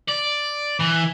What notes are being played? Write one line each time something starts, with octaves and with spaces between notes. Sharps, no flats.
D5
E3